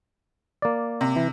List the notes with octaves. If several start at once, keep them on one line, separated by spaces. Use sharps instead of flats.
A#3 D5
C3
E3